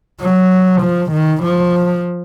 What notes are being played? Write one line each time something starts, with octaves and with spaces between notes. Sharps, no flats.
F#3
F3
D#3
F3